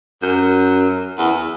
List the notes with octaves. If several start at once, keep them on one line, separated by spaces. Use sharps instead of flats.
F#2
E2